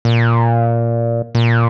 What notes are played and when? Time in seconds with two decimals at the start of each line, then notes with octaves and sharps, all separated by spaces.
0.05 A#2
1.35 A#2